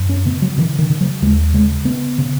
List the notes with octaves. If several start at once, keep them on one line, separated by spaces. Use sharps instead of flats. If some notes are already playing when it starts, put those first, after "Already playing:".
Already playing: F#2
C#4
C#3 B3
F#3
C#3 E3
D#3
C#3
F#3
D#2 G#3
C#3 G#3
C#3 B3
C#3